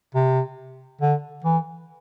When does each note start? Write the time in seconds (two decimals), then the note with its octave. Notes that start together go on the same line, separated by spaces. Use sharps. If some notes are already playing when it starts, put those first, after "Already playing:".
0.15 C3
1.01 D3
1.44 E3